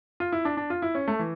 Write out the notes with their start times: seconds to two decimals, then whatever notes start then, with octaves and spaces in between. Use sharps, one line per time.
0.20 F4
0.32 E4
0.45 D4
0.57 D4
0.70 F4
0.82 E4
0.95 C#4
1.08 A3
1.19 E3